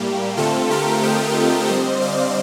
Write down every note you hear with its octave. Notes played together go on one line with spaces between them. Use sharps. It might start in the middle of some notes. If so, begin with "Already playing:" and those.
Already playing: A2 G3 A#3 G4
D3 A3 C4 F4 A4
G4 A#4
D#5 G5
D3 G3 C4 C5 D#5
D5 F5